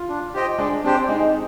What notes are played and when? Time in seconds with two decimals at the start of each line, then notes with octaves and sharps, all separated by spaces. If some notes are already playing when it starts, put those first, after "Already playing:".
Already playing: F4
0.09 D4
0.34 G4 C5 D#5 G5
0.59 G#3 D4
0.84 C4 D4 G4 C5 G5
1.08 G#3 D#4